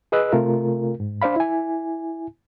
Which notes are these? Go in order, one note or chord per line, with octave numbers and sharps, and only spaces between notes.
G#4 B4 D#5 E6 F#6
C3 A3 F4 A#4
G#2
D4 C5 D5 F5 B5
E4 G#5